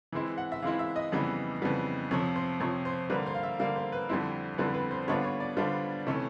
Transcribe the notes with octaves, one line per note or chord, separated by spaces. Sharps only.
E3 G#3 C4 E4
F#5
E5
E3 G#3 C4 E4 F5
E5
D#5
F2 C#3 E3 G3 B3
F2 C#3 E3 G3 B3
F2 C3 F3 C#5
C5
F2 C3 F3 C#5
C5
D3 G3 A#3 B4
C5
F5
E5
D3 G3 A#3 F5
C5
B4
F2 D3 G3 C4 E4
F2 D3 G3 C4 E4 B4
B4
C5
D3 G3 B3 D4 F4 C#5
C#5
D5
D3 G3 B3 D4 F4 C5
C3 E3 A3 C#4